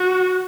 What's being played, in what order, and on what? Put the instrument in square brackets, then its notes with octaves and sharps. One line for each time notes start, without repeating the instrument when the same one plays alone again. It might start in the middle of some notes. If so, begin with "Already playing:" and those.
Already playing: [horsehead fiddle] F#4